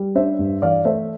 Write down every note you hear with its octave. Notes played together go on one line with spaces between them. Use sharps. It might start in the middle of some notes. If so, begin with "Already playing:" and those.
Already playing: G3
D4 C5 E5
G2
E3 D5 F5
A3 C5 E5